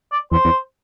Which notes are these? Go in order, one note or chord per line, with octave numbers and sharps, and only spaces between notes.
D5
E2 C5
E2